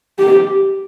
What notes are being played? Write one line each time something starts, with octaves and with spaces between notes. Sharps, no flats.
G4